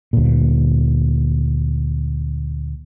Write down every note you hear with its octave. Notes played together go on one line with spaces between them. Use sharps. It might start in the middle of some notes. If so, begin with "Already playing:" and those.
D2 A#2